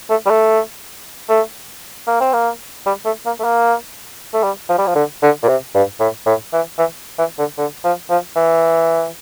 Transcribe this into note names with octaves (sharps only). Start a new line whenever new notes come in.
A3
G3
A3
A3
A#3
C4
A#3
G3
A3
A#3
A3
A#3
A3
G3
F3
G3
F3
D3
D3
A#2
C3
G2
A2
A2
E3
E3
E3
D3
D3
F3
F3
E3